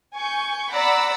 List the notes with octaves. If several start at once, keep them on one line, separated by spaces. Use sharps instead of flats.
G#5 C#6 G6
D5 F#5 A#5 B5 D6 E6